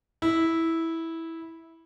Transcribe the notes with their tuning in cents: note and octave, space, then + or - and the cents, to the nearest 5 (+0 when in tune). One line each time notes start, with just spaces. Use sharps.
E4 -10